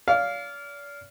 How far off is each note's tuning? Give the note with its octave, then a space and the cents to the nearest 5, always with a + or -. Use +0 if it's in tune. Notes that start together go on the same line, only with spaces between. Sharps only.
D5 -40 F5 +0